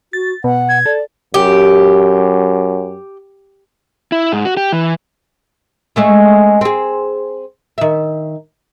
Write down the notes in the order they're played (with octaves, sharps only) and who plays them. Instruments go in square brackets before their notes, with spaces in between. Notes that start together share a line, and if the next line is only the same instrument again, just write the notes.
[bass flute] F#4 [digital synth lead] A6
[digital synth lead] B2 [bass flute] F#5
[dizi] G#6
[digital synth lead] A4 [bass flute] D5
[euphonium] F#2 [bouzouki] G4
[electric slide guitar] E4
G#2
F#4
G4
E3
[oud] G#3 A3 C#4
C4 G#4
D#3 E5